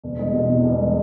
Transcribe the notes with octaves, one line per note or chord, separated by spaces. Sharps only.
E1
G#3
B2
E2
E1
G#3